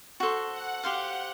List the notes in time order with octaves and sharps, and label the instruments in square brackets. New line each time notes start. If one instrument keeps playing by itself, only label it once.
[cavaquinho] F#4 A4 C5
[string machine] F#5
[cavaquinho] G4 C5 F5